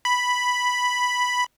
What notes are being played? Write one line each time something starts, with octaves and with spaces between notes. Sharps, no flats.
B5